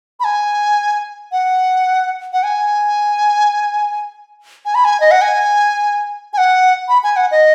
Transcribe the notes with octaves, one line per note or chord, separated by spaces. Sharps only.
B5
G#5
F#5
F#5
G#5
G#5
B5
G#5
D#5
F#5
G#5
G#5
F#5
B5
G#5
F#5
D#5